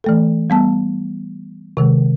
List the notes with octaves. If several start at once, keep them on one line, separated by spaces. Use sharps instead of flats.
E3 A3 A4
G3 B3 A5
C3 D#3 G#3